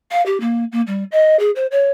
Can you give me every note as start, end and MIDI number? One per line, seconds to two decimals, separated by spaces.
0.11 0.24 77
0.25 0.40 67
0.40 0.64 58
0.72 0.81 58
0.87 1.03 55
1.11 1.38 75
1.39 1.50 68
1.55 1.66 72
1.71 1.91 73